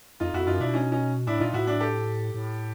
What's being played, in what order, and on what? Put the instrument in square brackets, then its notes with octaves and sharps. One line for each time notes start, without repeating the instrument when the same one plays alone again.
[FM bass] F2 [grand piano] D#4 F4
[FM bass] F2 [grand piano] E4 F#4
[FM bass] F#2 [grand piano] D#4 F4
[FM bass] B2 [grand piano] D4 E4
[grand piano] C#4 D#4
C#4 D#4
[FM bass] A2 [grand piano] D4 E4
[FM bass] A#2 [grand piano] D#4 F4
[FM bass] A2 [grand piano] E4 F#4
[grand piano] D4 E4
G4 A4
[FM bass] A2